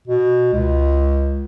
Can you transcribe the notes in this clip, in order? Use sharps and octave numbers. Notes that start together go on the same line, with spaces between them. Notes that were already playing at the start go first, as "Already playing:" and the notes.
B2
C#2